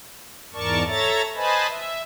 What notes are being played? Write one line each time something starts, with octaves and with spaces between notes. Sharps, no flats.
E2 G#2 A#4 D5 A5 C#6
A4 C#5 E5 A#5 A6
B4 C5 D#5 G#5 A5 B5
E5